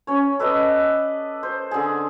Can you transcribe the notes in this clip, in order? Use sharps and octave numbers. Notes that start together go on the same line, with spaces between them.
C#4 C#5
A4 B4 D5 D#5
C5
D3 G#4